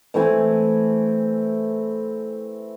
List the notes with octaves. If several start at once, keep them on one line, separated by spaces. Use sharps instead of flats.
E3 A3 C4 G#5